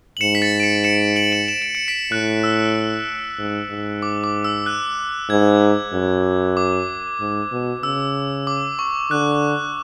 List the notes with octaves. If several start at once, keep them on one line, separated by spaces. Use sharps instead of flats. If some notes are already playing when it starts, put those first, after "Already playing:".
F#7
G#2 C#7 E7
B6
A6 C#7
D7
C#7 E7
C#7 E7
D7 F#7
C#7 E7
E7
D7
C#7
B6 D7
A2 F#6
E6
G#2
G#2
D6
D6
E6
F#6
G#2 G#6
F#2
D6
G#2
B2
C#3 E6
D6
C#6
D3 F#6